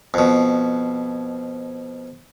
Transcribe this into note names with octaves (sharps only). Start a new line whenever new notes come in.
F2 B2